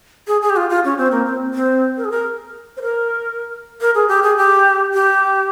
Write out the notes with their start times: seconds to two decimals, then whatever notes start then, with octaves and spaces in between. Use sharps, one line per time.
0.27 G#4
0.42 G#4
0.50 G4
0.56 F4
0.69 F4
0.84 C#4
0.98 C4
1.12 A#3
1.26 C4
1.54 C4
1.97 A#4
2.04 G#4
2.11 A#4
2.77 C5
2.82 A#4
3.81 A#4
3.95 G#4
4.08 G4
4.23 G#4
4.37 G4
4.94 G4